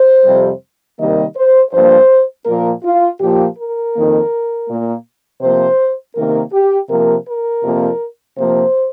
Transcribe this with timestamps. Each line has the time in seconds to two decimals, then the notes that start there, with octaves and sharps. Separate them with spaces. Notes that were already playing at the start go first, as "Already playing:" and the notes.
Already playing: C5
0.24 F2 C3 G3
0.98 C3 D#3 G3 A#3 D#5
1.35 C5
1.71 G2 F3 A#3 C5
2.45 A#2 F3 A#3 A#4
2.83 F4
3.20 A#2 F3 A#3 G4
3.57 A#4
3.94 F2 D#3 A#3
4.68 A#2 A#3
5.41 C3 F3 A#3 C5
6.15 C3 D#3 A#3 A#4
6.52 G4
6.89 C3 F3 A#3 A#4
7.27 A#4
7.63 F2 C3 F3 A#3
8.37 C3 F3 A#3 C5